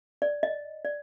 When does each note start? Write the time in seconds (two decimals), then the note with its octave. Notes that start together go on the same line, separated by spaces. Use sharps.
0.22 D5
0.43 D#5
0.85 D5